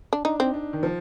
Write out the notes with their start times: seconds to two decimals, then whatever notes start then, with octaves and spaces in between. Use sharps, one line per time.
0.13 D4
0.25 D4 D#4
0.39 C4 D#4
0.54 D4
0.73 D#3
0.83 F3